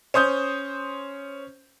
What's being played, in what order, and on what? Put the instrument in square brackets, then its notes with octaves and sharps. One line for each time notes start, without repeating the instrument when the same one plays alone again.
[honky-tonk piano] C#4 C5 D#6 G6